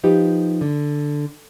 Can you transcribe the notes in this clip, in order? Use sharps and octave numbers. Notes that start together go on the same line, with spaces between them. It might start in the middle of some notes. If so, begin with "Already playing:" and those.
F3 D#4 G4 B4
D3